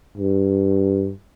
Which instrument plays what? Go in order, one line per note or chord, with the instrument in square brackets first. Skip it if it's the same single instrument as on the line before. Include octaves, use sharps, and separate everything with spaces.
[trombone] G2